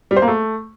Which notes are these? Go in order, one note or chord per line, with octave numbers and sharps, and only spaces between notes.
G3
C5
A#3
A3